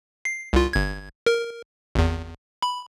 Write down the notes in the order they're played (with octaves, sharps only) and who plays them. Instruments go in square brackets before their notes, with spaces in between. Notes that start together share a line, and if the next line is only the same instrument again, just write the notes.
[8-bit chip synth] C7
C2 F4
G1 G#6
A#4
G#1 E2
B5